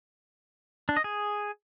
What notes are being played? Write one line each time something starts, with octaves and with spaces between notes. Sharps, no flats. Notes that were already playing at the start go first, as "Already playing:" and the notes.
D4
D#5
G#4